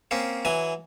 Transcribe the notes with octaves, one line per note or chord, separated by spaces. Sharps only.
A#3 C4 C#4
E3 F#3 G#5